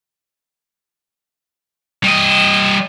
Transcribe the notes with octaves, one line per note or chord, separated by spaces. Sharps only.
G3 D#5